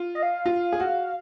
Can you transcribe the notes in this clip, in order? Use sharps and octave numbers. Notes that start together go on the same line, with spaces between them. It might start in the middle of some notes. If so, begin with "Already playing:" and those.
Already playing: F4
D#5
F5
F4
G#4
F#4